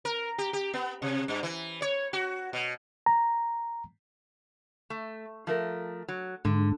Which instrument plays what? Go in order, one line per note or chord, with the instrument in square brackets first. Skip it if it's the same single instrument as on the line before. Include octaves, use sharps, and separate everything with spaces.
[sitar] A#4
G4
G4
B3
C3
G2
E3
C#5
F#4
B2
[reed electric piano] A#5
[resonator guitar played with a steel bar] A3
F3 A3 A#4
F#3
[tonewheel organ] G#2 [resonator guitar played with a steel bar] D3